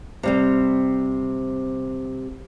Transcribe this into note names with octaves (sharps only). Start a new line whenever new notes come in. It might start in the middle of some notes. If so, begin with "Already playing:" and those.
C3 G3 C4